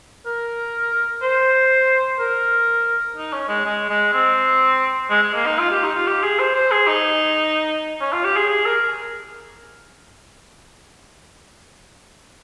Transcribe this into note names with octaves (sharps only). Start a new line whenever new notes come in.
A#4
C5
A#4
D#4
C#4
G#3
G#3
G#3
C4
G#3
G#3
A#3
D#4
F4
G4
D#4
F4
G4
G#4
C5
C5
G#4
D#4
C#4
F4
G4
G#4
G#4
A#4